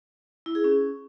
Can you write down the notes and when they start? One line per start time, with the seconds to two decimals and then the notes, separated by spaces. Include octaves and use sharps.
0.46 E4
0.55 G#4
0.64 C#4